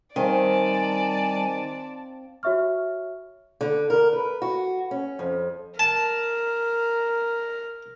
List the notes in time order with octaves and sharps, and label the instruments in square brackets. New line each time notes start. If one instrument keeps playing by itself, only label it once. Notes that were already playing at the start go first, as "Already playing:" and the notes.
[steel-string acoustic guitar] D#3 [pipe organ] G3 G#5 [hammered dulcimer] C4 C5 F5 [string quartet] D5 A5
[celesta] F#4 C#5 E5 C#6 F6
[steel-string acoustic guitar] D3
A#4
B4
F#4
C#4
F2
[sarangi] A#4 [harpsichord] A5